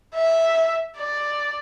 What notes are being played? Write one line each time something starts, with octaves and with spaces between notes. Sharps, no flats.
E5
D5